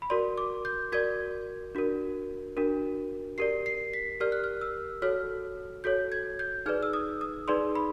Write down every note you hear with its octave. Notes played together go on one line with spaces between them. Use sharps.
B5
F#4 A#4 D5 C6
D6
G6
F#4 A#4 D5 G#6
D4 F#4 A#4
D4 F#4 A#4
G4 A#4 D5 C7
C7
B6
G4 A#4 D5 F6
F#6
F6
E6
F#4 A4 C#5 F6
F#4 A4 C#5 G6
G#6
G6
D#4 G#4 B4 D5 F6
E6
D#6
D#6
D#4 G#4 B4 D5 C6
B5